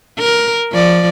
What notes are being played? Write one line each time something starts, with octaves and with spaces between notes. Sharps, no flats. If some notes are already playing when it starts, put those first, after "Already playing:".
A#4
F3 D5